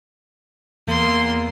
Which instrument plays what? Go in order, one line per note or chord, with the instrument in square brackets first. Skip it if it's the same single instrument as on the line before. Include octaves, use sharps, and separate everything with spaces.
[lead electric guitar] E2 [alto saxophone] A#3 [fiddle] C6